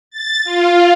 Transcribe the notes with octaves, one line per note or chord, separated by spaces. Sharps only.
A6
F4